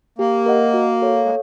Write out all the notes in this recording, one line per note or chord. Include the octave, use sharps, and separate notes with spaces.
A#3 G4
A#4 D#5 F#5
F#4
A4 C#5 F5
G#3